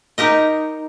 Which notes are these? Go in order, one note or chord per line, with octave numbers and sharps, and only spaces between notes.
D#4 G4 A#4 D#5